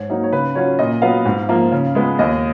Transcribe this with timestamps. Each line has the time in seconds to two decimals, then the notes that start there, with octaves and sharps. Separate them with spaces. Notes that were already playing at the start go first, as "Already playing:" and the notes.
Already playing: G#2 C#5
0.09 F#3 A#3 D#4
0.24 C#5
0.32 C#3 B4
0.55 F#3 C#4 F4 C#5
0.79 A#2 D#5
1.02 F#3 B3 F4 F5
1.25 G#2
1.49 F3 A#3 F4
1.72 C#3
1.95 G#3 B3 F4
2.19 D#2 D#5